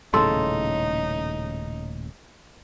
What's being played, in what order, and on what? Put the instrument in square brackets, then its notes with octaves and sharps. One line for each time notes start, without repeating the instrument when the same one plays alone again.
[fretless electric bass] D#1 A2 C#3 [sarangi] D#4 [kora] A4 [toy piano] C6